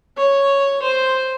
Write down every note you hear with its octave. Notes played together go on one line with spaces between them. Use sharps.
C#5
C5